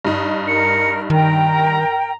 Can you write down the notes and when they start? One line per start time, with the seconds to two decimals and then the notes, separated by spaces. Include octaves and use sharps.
0.05 G2 D#4
0.48 A#4 C#7
1.10 D#3 A#4 G5 A#5